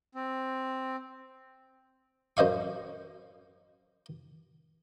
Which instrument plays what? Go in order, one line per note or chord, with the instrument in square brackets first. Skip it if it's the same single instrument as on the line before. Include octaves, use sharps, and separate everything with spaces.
[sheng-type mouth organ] C4
[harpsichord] F#2 C5 D#5 F5 C#6